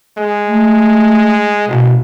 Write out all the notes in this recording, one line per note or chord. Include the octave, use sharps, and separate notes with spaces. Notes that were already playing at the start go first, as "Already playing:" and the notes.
G#3
A3
A1 B2